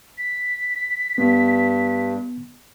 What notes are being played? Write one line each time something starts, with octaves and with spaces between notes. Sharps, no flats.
B6
G2 B3